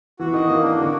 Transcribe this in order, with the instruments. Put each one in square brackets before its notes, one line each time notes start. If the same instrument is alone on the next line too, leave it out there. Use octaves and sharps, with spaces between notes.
[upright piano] E3 [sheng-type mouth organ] F#4
[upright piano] D#3 [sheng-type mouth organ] D#5
[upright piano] D#3 [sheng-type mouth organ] A#3
[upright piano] D#3 [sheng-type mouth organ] D4
[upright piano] D3 [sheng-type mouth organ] F#4